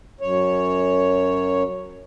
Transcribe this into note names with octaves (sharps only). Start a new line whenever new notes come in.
F#2 C#5